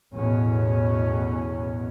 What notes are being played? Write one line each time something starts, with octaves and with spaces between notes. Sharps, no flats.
A1 E2 B2 C#4